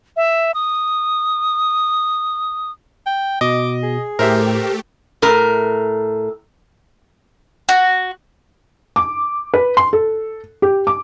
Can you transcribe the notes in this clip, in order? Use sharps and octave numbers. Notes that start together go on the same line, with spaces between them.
E5
D#6
G5
B2 D#5 D6
G#4
A2 A3 G4 A#4 C5 E5
A2 A#4
F#4
D6
B4
C6
A4
G4
D6